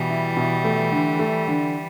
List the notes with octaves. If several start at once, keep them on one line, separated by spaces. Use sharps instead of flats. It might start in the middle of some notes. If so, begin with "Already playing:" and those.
Already playing: B2 E3 G3
E4
B2
A3
D3
A3
D3